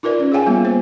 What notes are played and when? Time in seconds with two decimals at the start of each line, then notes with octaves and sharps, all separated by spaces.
0.03 D#4 F4 A#4 B4 D5
0.20 C#4
0.32 G#4 C#5 F5 G5 G#5
0.46 G3 A#3 B3 F4
0.65 C5